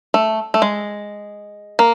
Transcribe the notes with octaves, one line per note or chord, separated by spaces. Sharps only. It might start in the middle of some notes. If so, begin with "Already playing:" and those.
A3
A3
G#3
A#3